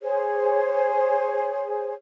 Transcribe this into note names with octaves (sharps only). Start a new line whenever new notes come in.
G#4 C5 C#5